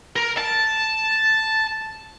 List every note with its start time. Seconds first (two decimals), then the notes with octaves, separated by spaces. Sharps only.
0.16 A#4
0.37 A5